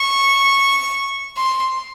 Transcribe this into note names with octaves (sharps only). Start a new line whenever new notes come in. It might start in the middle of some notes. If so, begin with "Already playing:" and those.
Already playing: C#6
C6